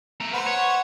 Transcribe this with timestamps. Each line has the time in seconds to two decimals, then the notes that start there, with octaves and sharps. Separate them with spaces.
0.20 A3 A#4
0.33 B4 C5 F#5
0.47 C#5